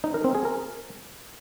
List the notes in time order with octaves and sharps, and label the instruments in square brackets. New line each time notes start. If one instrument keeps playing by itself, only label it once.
[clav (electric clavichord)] D#4
A#4
C4
G#4
A#4